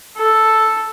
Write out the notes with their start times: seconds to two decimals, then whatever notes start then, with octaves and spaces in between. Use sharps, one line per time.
0.17 A4